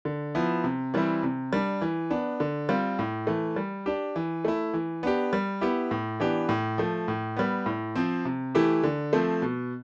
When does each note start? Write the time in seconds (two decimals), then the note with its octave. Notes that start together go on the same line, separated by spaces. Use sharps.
0.05 D3
0.35 F3 B3 E4
0.64 C3
0.94 E3 G3 C4 E4
1.23 C3
1.53 G3 D4
1.82 E3
2.10 B3 D4
2.40 D3
2.69 G3 C4 F4
2.99 A2
3.27 E3 A3
3.56 G3
3.86 D4 G4
4.16 E3
4.45 A3 E4
4.74 E3
5.03 B3 D4 G4
5.33 G3
5.61 B3 E4 G4
5.91 A2
6.20 E3 B3 D4 G4
6.49 A2
6.78 F3 A3
7.08 A2
7.36 G3 B3
7.66 A2
7.95 F3 C4
8.25 C3
8.55 E3 A3 E4 G4
8.84 D3
9.13 F3 A3 C4
9.42 B2